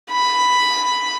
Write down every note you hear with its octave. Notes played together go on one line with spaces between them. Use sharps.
B5